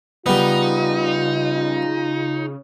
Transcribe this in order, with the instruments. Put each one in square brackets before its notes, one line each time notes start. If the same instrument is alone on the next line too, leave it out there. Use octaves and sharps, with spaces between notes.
[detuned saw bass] C#3 [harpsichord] G3 B3 [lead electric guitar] D#4 [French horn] F4